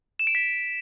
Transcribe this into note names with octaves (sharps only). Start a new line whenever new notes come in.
E7
D7
B6